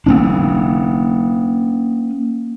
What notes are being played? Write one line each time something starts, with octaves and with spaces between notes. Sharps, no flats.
A#3 C#4 D4